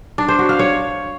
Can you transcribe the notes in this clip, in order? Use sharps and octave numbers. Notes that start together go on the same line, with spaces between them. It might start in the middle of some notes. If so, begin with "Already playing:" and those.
D4
C5
F#4
F5
C#5